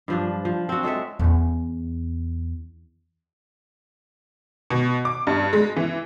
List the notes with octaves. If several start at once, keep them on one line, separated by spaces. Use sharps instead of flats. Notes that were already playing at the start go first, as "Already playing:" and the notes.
G2 F3 D4
F3
C4 F#4
G#3 A4 C#5 E5
E2 C#4
B2
D6
G2
G#3
E3